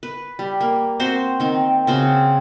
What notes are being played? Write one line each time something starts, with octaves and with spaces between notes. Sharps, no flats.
B4
G3
A#3
C4 F#4 C5
D#3 C4
C#3 C4 F#4